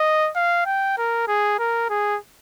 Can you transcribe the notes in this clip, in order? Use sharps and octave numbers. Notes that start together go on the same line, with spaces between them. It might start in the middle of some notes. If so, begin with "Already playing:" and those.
Already playing: D#5
F5
G5
A#4
G#4
A#4
G#4